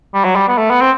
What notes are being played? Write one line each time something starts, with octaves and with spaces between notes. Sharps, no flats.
G3
F#3
G3
B3
A3
B3
C4